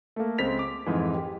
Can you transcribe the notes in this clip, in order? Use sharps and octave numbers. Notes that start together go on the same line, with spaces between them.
A3 A#3
C#2 C4 B6 F7
D6
F2 G#2 E3
G4